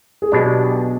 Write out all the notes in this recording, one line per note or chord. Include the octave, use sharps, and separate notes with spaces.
G#4
B1 B2 G#3 D4 G4